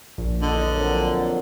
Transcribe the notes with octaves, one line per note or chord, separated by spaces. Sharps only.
A#1
E2 D3 D#5
F2 A#2 F#3